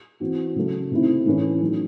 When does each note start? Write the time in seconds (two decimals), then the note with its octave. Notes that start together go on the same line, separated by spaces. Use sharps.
0.20 E3 C4 F#4
0.56 C#3 F#3 A3
0.91 C3 D#3 A3 C4 E4
1.26 A2 E3 A3 C#4
1.61 D#3 F#3 C#4